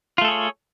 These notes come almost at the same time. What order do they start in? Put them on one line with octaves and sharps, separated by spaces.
F4 A3 A4 G#4 C#5